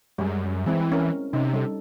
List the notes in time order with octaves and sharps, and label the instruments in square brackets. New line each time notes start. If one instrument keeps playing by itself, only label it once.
[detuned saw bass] F#2 [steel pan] G3 G#3
[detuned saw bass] E3 [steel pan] G#3 C4 E4
[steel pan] C#4 A#4
[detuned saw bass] C3 [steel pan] C#4 D#4
[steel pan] G3 A4